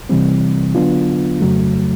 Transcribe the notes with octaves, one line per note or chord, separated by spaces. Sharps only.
C3 E3 G3 C4
D3 F#3 B3 D4 F4
F2 C#3 F#3 A3